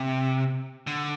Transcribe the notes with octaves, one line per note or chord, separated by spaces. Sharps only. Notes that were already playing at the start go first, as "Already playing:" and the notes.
Already playing: C3
D3